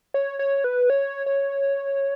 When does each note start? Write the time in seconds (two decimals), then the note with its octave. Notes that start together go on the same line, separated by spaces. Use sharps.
0.14 C#5
0.39 C#5
0.64 B4
0.90 C#5
1.26 C#5